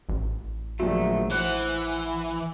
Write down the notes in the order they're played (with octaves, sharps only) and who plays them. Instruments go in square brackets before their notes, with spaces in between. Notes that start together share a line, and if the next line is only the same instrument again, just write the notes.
[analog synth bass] A1
[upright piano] A#1 F3 F#3 [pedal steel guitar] D#3 A3
[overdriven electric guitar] E3 [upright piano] C5 [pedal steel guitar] F#5